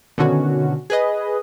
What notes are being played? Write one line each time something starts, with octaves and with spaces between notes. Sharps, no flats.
B2 D3 D#3 C#4 F#4
G#4 B4 D#5